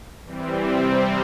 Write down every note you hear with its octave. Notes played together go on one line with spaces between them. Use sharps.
E3 G3 C4
C3 G3 C4